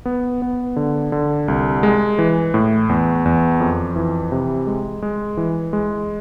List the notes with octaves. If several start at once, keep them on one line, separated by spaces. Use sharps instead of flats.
B3
B3
D3
D3
C2
G#3
E3
A2
E2
E2
F2
E3
C3
G#3
G#3
E3
G#3